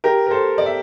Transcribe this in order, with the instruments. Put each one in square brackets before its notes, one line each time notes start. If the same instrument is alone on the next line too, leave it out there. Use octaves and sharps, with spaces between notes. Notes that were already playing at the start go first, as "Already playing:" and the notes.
[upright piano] G4 A#4
A#4
A4 C5
D5
E5